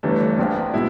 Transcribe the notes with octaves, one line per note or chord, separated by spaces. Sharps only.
G1 G2 E3 A3 D4
A#1 A#2 F3
B2 G#3 E4